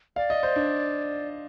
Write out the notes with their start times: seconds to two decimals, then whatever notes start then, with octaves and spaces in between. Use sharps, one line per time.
0.16 D5 F5
0.30 D#5
0.43 C5
0.56 D4